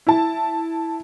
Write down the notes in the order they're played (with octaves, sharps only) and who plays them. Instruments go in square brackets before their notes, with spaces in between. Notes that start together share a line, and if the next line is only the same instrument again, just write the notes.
[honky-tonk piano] E4 A5